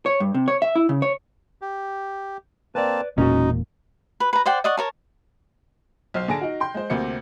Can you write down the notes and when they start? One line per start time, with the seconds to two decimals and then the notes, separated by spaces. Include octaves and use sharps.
0.06 C#5
0.20 G2
0.34 C3
0.48 C#5
0.62 E5
0.75 E4
0.89 C#3
1.02 C#5
1.62 G4
2.75 A#3 C4 B4 D5 A5
3.18 E1 A#2 C#4 D#4 F#4
4.20 B4
4.33 B4 A#5
4.46 C5 D5 F#5 G5
4.64 D5 D#5 F#5 C#6
4.77 A#4 C#5 A5
6.14 B1 C5 F6 C7
6.28 D3 G#4 A5 A#6 D7
6.41 D#4 F#4
6.60 G5 C6 G6
6.74 G#3 C5
6.90 D2 C3 A#3 C5 C#7